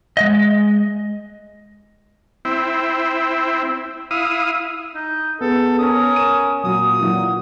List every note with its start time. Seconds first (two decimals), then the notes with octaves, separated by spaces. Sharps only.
0.17 G#3 D#5
2.45 C4 E4
4.11 E4 F5 D#6
4.95 D#4
5.41 B3 G#4 A4
5.79 C#4 A#4 D#6
6.16 D#7 E7
6.64 A#2 F#3 D#6
7.01 E3 F#3 F#4